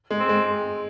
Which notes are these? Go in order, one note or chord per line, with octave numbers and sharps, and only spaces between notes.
G#3
C4
G#3